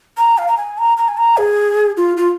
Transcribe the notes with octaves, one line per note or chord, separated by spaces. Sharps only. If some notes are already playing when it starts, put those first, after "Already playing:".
A#5
F5
A#5
G#5
A#5
A#5
G#5
A#5
G#4
F4
F4